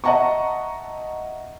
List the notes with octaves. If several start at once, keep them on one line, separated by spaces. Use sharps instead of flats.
D#5 E5 F#5 A5 A#5 C#6